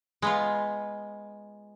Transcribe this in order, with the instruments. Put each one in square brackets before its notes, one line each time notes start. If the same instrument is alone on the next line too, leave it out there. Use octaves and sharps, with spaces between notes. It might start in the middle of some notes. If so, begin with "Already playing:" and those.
[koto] G#3 B3 F4